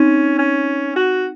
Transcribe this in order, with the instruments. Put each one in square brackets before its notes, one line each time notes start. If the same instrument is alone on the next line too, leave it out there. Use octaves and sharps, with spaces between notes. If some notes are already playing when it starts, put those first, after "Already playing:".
Already playing: [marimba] C4 D#4 [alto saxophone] C#4
[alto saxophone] C#4
F#4